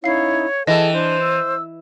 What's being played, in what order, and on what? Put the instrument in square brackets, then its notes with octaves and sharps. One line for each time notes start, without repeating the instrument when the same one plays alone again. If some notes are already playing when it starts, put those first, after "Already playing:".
[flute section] C#4 D#4 E4 [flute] C#5 [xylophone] F5 C7
[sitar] E3 [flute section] G#4 A4 G5 [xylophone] D#5 [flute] A5
[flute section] D4 [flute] C5
[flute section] E6